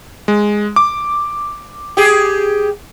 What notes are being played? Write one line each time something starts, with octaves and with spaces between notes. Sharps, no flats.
G#3
D6
G4 G#4